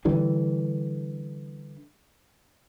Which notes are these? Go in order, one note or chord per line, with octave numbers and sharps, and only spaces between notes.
D3 E3 G3